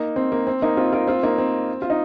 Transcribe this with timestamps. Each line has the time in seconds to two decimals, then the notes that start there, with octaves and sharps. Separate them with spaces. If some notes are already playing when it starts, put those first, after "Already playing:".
Already playing: A#3 D#4
0.16 C4
0.32 A#3
0.47 C4
0.62 A#3 D#4
0.77 C4 F4
0.92 F4 A#4
1.07 C4 F4
1.23 A#3 D#4
1.38 C4
1.82 F4
1.90 D#4